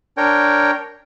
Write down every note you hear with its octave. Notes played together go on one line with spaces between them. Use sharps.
D4 A#4 C#5 G5